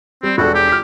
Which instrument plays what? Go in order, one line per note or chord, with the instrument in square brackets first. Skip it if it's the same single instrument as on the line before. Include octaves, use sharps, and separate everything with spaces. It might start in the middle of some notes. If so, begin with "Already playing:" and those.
[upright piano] G3 [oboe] C4
[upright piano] E1 D4 A4 [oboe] F#4
[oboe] G4
[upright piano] F6 B6